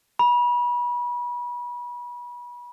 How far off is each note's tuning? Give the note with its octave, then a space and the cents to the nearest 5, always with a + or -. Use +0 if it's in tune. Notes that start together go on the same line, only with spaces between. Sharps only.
B5 -30